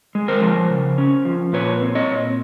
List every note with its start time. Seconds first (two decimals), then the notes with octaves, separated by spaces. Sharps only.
0.15 G#3
0.28 A#4 C5
0.42 F3
0.70 C#3
0.98 C#4
1.25 F3
1.53 A#2 B4 C#5
1.82 C4
1.95 C#5 D#5
2.10 A#2